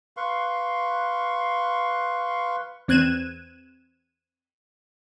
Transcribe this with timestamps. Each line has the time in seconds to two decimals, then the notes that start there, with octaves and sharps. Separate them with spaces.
0.17 B4 F5 C6 C#6
2.88 E2 C4 F#6 G#6 D#7 E7